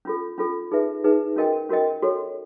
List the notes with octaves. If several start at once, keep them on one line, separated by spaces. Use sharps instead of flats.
C#4 F4 A4
C#4 F4 A4
D#4 G#4 B4 E5
D#4 G#4 B4 E5
C#4 F#4 A#4 D#5 G5
C#4 F#4 A#4 D#5 G5
F#4 A4 C#5